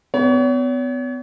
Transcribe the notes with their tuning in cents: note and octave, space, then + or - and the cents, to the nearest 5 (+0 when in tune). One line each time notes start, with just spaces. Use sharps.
B3 +35 C#5 +40